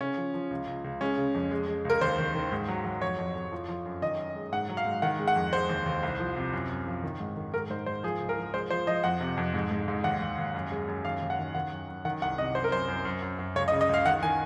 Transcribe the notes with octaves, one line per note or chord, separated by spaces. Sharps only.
C#3 C#4
F3
F3
C#2
C#2
C#2
G#3 C#4
C#3
F2
G#3
G#3
C#2 A#4
D#2 C5
D#3
D#3
G#2
F#3
F#3
F2 C#5
F2
F2
F3
F3
F#2
D#3 D#5
F#2
G#3
G#2 F#5
F#3
F5
G#2
D#3 F#5
G#3
F#5
F2
G#3 C5
D#2
D#2
C2
F3
C3
F#2
F#2
F3
D#3
G#2
D#3
G#2 A#4
G#2 C5
G#2 C5
F3 G#4
C#2
A#4
F3
G#3 C5
F3 C5
F3 D#5
F2 F#5
C3
F2
G#2
G#2
G#2
D#2 F#5
D#2
D#2
F#2
G#3
F#2
D#2 F5
D#2
F#5
D#3
D#3 F#5
F#2
F#2
D#3 F#5
C2 F#5
C3 D#5
F#2 C5
A#4
F#2 C5
F#2
F#2
F#2
F#2
C#2 C#5
D#5
C#3
D#5
C#2 F5
D#3 F#5
D#3 G#5